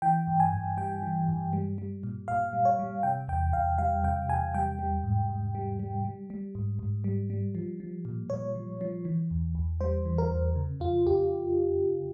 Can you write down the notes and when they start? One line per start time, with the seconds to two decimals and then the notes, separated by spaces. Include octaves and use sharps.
0.02 E3 G5
0.27 G2
0.40 G#5
0.53 G2
0.77 G3 G5
1.03 E3
1.28 G2
1.53 G3
1.78 G3
2.03 A#2
2.28 A#2 F5
2.53 G3
2.65 C#5
2.79 G3
3.03 C3 G5
3.28 E2 G5
3.53 E2 F5
3.78 G3 F5
4.04 C3 G5
4.29 E2 G#5
4.54 G3 G5
4.79 G3
5.04 G#2
5.29 G#2
5.55 G3
5.79 G3
6.05 G3
6.30 G3
6.55 G#2
6.79 G#2
7.04 G3
7.30 G3
7.55 F3
7.80 F3
8.05 A#2
8.30 A#2 C#5
8.55 F3
8.81 F3
9.05 E3
9.31 E2
9.55 E2
9.81 G3 C5
10.05 E3
10.18 A#4
10.31 E2
10.55 C#3
10.80 F2 F4
11.06 F2 G4